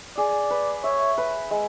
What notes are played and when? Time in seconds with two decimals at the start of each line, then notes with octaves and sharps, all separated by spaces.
0.17 G#4 D5
0.50 B4
0.84 C#5 E5
1.18 B4
1.51 G#3